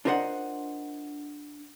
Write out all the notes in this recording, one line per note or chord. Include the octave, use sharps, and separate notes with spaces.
D4 F4 A#4 C5 D#5 F#5